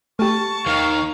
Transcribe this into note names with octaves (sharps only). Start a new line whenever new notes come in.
A3 G4 A5 C#6
D#2 D#3 F5